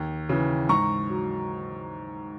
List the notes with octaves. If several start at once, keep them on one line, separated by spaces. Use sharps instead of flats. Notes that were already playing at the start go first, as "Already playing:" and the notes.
Already playing: D#2
C#3 E3
G#2 A#5 C#6
F#3